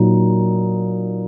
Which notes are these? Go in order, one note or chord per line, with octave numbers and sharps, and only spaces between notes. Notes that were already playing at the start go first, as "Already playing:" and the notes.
Already playing: A#2 F#3 D#4